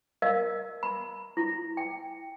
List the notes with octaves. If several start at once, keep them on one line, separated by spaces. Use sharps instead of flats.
A#4 D#5 F5
B5
E4
G5